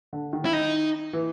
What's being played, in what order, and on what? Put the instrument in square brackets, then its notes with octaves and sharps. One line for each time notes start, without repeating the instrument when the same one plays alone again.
[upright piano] D3
D#3
[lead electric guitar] E4
D#4
[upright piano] E3